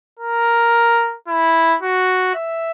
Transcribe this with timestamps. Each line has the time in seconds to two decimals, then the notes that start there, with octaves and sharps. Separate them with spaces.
0.19 A#4
1.28 E4
1.82 F#4
2.35 E5